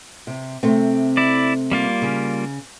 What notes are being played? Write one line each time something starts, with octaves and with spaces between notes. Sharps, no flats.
C3
C3 A3 C4
E4 D5
G3 A#3 F4
C#3